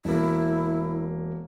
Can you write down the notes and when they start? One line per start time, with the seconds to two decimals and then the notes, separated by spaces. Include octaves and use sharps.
0.05 E1 A#3 E4